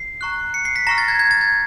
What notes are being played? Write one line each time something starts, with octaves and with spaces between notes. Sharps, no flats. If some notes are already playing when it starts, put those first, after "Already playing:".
Already playing: C7
A#5 C#6 F#6
C#7
C7
B6
A#5 C#6 F6 A#6
A6
G#6
G#6
A6
G#6